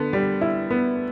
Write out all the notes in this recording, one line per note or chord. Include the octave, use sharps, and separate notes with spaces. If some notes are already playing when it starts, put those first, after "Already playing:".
Already playing: D3 B3
G3
E4
B3